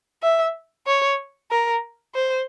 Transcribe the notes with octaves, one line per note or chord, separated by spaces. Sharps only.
E5
C#5
A#4
C5